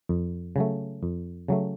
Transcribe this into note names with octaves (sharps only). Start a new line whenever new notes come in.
F2
C#3 F#3 A3
F2
C#3 F#3 A3